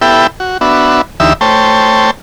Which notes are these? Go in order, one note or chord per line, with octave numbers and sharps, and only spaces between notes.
B3 E4 G4 A4 E5 G5
F#4
B3 D4 F#4 E5
D2 E3 D#4 G4 E5 E6
A3 C5 C#5 G5 A5